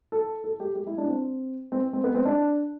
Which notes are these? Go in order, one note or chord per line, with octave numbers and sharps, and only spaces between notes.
A4
A4
G4
G4
E4
D4
C4
C4
C4
B3
C4
D4